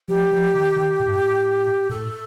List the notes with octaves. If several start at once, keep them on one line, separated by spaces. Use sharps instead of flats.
F3 G4
F3
D#3
D#3
A2
G2
A2
A2 A4